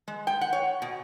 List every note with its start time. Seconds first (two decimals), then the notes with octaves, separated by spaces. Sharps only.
0.08 G#3
0.27 G5
0.41 F#5
0.53 C#5
0.82 B2